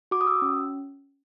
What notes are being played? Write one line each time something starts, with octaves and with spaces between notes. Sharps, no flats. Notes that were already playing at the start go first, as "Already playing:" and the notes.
F#4 D6
D#6
F#4 E6
C#4